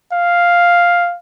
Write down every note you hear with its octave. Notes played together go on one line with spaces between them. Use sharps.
F5